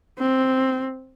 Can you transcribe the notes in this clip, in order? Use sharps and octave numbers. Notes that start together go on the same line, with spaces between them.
C4